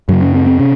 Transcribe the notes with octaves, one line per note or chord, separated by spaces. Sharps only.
F#2 C#3 F#3
C#4
C4
C4
C3 C#4